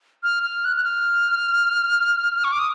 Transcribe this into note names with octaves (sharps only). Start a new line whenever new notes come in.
F6
F6
F#6
F#6
F6
C#6
D6
D#6